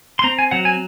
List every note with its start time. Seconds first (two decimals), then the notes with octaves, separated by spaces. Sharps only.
0.19 C6
0.24 C4 A#5
0.39 G#5
0.51 F#3 F#5
0.65 G#5